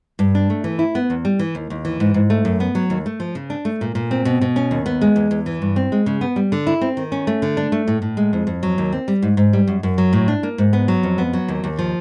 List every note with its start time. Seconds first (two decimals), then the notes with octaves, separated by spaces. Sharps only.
0.19 G2
0.35 D4
0.50 A3
0.64 E3
0.79 E4
0.95 B3
1.10 E2
1.25 G3
1.39 E3
1.55 D#2
1.70 D#2
1.85 E3
2.00 G#2
2.14 G#2
2.30 A3
2.45 F#2
2.60 B3
2.75 F#3
2.90 D#2
3.06 A3
3.20 F3
3.35 C#3
3.50 D4
3.65 A3
3.81 A#2
3.95 A#2
4.11 C4
4.25 B2
4.41 B2
4.56 C#4
4.71 D#2
4.86 B3
5.01 G#3
5.16 E2
5.31 E2
5.46 E3
5.62 G2
5.76 C4
5.92 G#3
6.06 C#3
6.21 B3
6.36 G3
6.52 D3
6.67 E4
6.81 C4
6.97 D#3
7.12 C#4
7.27 A3
7.42 D3
7.57 D4
7.72 A3
7.88 A2
8.02 A2
8.17 G#3
8.33 F2
8.47 F2
8.63 F#3
8.78 D#2
8.92 C4
9.08 G3
9.22 G#2
9.37 G#2
9.53 G3
9.67 F#2
9.83 F#2
9.98 F#3
10.13 A2
10.28 D4
10.43 A#3
10.58 G#2
10.73 B3
10.88 F#3
11.03 F2
11.18 B3
11.33 F#3
11.48 D#2
11.64 D#2
11.78 F3